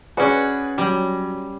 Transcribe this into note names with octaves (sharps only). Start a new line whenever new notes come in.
C#4 F#4 G#4 B4 D5
F#3 G3